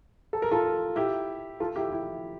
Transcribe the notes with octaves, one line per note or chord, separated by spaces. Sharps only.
A4
A#4
F4 A4
E4 G4
F4 A4
E4 G4
E4